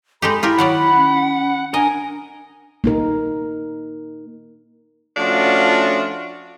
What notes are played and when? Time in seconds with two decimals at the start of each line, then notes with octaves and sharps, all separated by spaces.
0.22 G#3 D#4 G4 A4 B5
0.43 E4 F4 G4 A#4
0.58 D#3 F#3 D5 F#5
0.96 C#4
1.74 D4 A#4 D#5 G#5
2.84 A#3 D#4 A#4
5.17 F3 A3 C#4 D4 F4 F#4